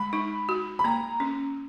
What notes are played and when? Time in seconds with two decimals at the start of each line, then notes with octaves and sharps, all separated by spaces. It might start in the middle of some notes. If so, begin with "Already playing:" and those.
Already playing: G#3 B5
0.13 D#4
0.49 F#4
0.79 B5
0.84 A#3 A#5
1.20 C#4